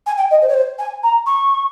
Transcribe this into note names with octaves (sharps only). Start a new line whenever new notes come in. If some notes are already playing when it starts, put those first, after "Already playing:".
G#5
G5
D#5
C5
C#5
C5
G#5
A#5
C#6